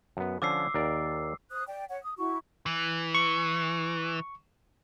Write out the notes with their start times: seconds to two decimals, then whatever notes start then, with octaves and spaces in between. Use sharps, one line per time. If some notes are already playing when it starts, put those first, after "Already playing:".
0.17 F#2 B3
0.42 D3 F3 C#4 D6 E6 C7
0.74 D#2 A#4 D5
1.51 C5 D#6 F#6
1.68 D5 G5
1.89 C#5 F#5
2.03 D#6
2.18 E4 F#4 C#6
2.66 E3
3.15 C#6